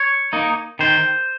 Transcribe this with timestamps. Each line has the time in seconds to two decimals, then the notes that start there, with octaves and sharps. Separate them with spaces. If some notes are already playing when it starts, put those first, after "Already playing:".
Already playing: C#5
0.33 A#3 D#4
0.79 D#3 C5